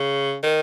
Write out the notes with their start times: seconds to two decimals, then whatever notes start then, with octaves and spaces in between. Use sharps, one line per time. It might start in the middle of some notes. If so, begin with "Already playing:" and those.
Already playing: C#3
0.43 D#3